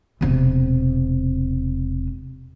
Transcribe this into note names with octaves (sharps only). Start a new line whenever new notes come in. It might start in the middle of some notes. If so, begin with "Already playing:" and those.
E1 C3